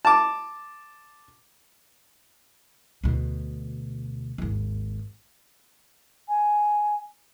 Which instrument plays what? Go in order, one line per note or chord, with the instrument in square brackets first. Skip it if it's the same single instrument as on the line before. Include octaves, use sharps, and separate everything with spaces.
[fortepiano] A5 D6
[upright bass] D2 B2
G#1 D#2
[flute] G#5